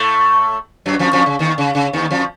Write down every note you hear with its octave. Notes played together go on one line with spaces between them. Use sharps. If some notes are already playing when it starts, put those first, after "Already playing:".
Already playing: A2 A3
F#2 F#3
F2 F3
F2 F3
C#3
D#2 D#3
C#3
C#3
D#2 D#3
F2 F3